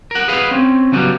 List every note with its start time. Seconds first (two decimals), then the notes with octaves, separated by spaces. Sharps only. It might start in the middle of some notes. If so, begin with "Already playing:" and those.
0.11 A#4 F#5
0.28 G#4 B4 F5 F#5
0.51 C4 C#4
0.92 C#3 F#3 G3 B3